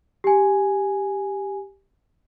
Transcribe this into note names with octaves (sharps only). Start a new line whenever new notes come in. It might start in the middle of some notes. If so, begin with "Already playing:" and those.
G4 G#5